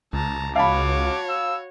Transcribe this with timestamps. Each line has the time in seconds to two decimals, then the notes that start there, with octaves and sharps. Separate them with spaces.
0.13 C#2 A5 A#5
0.56 F#4 C#5 F5 A5 B5 D6
1.29 E6